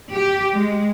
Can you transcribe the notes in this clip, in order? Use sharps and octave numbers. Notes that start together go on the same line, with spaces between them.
G4
G#3